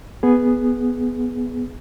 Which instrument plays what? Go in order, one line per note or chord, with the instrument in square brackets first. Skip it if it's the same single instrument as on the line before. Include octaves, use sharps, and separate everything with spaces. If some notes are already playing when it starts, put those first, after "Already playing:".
[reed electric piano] B3 G#4